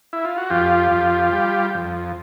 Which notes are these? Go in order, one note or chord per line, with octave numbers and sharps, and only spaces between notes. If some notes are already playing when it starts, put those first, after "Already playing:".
E4
F4
F#4
F2 F4 G4
F2
G3
F2